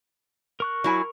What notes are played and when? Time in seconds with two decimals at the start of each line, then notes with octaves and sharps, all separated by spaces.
0.60 A#4 C#6 F#6
0.84 F#3 E4 G#5